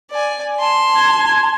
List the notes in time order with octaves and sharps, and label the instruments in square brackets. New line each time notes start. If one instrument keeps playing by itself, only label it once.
[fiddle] D5 G#5
[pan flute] A5 [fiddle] C6
[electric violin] G#6